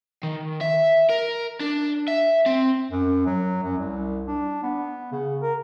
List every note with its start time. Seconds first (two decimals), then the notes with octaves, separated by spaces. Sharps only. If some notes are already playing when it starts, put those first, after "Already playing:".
0.23 D#3
0.61 E5
1.09 A#4
1.60 D4
2.08 E5
2.46 C4
2.91 F#2
3.26 F#3
3.63 F#2
3.77 C2
4.27 D4
4.63 B3
5.12 C#3
5.42 A#4